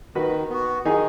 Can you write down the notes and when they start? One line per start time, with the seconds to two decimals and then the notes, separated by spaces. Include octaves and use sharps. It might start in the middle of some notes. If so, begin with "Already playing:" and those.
0.15 D#3 F#4 B4
0.50 B3 F#4
0.85 D#3 D#4 G#4